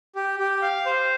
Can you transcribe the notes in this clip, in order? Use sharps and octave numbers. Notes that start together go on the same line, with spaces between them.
G4
G4
F5
C5